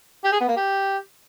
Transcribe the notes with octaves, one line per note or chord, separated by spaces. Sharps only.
G4
G#4
B3
A#3
G4